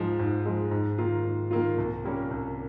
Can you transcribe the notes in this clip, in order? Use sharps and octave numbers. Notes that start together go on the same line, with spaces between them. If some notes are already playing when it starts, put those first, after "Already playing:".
Already playing: G#2 F3 G#3
G#2
F3 G#3
G#2
D#3 A#3 F4
G#2
D#3 A#3 F4
C2
A#2 G3 A#3 C#4
C2